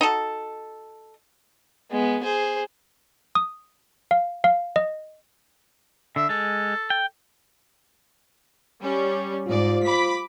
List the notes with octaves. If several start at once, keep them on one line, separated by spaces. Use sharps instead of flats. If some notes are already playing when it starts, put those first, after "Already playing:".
D#4 F#4 A4
G#3 B3
G#4 C5
D#6
F5
F5
D#5
D3 E5
G#3 A4
G5
G3 C#4
G#2 F4 C5 D5
B5 D6 B6